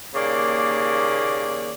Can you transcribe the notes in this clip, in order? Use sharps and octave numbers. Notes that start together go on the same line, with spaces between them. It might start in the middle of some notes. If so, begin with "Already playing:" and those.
D#2 C#3 A#3 D5